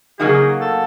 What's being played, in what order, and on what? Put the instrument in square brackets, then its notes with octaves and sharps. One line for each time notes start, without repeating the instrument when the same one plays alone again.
[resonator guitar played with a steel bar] C#3 F#3 A#3 D#4 F#4 [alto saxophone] G#4
[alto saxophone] A4